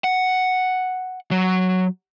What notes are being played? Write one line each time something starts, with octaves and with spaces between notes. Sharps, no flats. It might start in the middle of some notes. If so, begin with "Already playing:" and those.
F#5
F#3